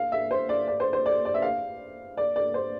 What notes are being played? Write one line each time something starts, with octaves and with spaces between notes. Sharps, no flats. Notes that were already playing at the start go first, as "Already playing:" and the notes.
Already playing: F5
E5
C5
D5
D5
C5
C5
D5
D5
E5
F5
D5
D5
C5